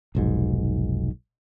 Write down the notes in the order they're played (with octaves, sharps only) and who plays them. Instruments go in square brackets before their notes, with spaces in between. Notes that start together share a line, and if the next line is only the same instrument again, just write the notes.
[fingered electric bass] F1 B1 G#2